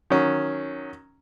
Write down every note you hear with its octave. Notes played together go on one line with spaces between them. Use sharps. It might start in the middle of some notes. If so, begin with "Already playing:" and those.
D#3 F#3 C#4